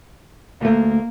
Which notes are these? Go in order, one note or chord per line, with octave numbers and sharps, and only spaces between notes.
D2 A3 A#3